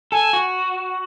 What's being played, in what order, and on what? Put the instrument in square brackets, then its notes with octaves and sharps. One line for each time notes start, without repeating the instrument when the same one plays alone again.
[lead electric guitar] A4 [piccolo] G#5
[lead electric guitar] F#4